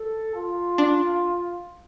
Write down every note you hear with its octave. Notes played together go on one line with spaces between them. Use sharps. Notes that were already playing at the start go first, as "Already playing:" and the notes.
Already playing: A4
F4
D4